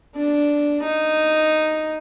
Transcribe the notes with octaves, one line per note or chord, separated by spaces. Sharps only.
D4
D#4